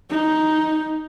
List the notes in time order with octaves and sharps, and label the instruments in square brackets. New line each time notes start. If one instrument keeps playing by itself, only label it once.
[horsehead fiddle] D#4